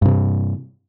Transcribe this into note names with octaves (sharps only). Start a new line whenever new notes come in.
G2 C3